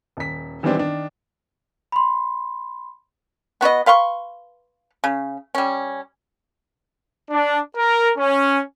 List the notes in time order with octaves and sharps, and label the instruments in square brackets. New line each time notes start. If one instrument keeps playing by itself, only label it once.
[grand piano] D#1 B6
D#3 E3 G3 B3 C4 D4
D#3 D4
[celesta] B5 C6
[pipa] B3 F#4 B4 D#5
B4 F5 C6 C#6
C#3
G3 C#4
[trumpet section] D4
A#4
C#4